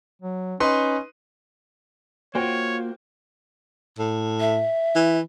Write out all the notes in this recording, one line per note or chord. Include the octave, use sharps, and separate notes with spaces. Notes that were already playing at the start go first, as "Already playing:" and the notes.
F#3
C#4 D#4 B4 C6
A#3 F4 F#4 C5 C#5 G5
A2
E5
E3